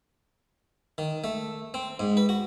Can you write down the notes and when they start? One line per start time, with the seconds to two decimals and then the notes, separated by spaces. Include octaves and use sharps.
0.98 D#3
1.24 A3
1.74 C4
1.99 G#2
2.17 B4
2.29 F#4